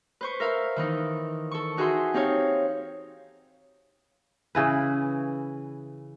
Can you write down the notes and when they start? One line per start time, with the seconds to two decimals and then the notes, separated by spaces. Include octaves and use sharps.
0.21 B4 C5 C#6
0.40 A#4 E5 F5
0.76 D#3 E3 D#4
1.51 A4 C#6
1.77 D#4 F#4 G#4 A4 E5 C6
2.14 C4 D#4 G4 C#5 F5
4.55 C#3 E3 B4